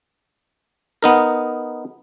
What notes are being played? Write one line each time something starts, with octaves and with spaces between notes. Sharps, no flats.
B3 D#4 A#4